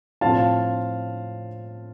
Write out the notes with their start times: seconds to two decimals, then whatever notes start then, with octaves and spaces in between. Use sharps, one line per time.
0.21 A2 F3 C4 F4 F5 A5